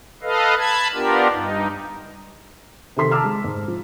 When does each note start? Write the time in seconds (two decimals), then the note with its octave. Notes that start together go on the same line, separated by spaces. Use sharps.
0.23 A4 B4 D#5 F5
0.59 A5 B5 G#6
0.94 B3 D4 F4 G4 A#4
1.30 G2 D#4
2.97 C3 D#3 A4 C6 B6
3.11 A5 A#5 D6 E6 F6
3.24 G#3
3.44 G#2
3.68 F3